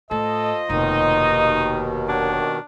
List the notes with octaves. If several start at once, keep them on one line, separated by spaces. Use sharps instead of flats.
A2 F4 A4 C5 D#5
F1 D#2 B2 D#3 D#4
D4 A#4 C#5 F#5